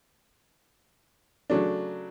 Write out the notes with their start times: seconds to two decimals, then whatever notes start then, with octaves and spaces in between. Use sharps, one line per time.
1.50 C#3 F#3 A3 D4